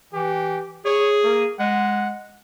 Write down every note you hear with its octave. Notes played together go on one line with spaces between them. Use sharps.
E3 G4
G#4 C#5
A#3
G#3 F#5